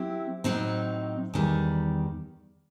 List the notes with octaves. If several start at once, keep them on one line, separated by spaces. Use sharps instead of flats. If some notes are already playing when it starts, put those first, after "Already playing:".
Already playing: F#3 C4 E4 G4
A2 F#3 C4 D#4
E2 D#3 G3